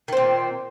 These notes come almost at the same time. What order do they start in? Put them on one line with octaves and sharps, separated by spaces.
D#3 C4 A#2